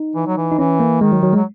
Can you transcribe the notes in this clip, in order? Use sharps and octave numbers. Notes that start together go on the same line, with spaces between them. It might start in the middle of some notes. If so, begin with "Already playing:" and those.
Already playing: D#4
E3
F#3
E3
D#4
E3 C#4
A#3
D#3 G#3
F#3
F#3
G#3
F#3